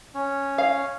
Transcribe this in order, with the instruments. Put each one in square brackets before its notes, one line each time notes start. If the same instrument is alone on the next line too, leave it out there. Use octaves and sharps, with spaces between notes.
[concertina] C#4
[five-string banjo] F5